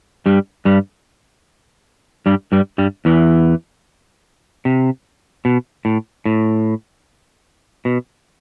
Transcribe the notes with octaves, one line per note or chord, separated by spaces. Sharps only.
G2 G3
G2 G3
G2 G3
G2 G3
G2 G3
E2 E3
C3
B2
A2
A2
B2